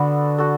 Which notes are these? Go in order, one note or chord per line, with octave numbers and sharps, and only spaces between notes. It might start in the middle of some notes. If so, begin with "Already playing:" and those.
Already playing: D3 B3 F#4 A4
F#4 A4